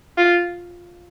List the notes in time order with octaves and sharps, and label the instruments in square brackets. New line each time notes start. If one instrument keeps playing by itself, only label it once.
[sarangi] F4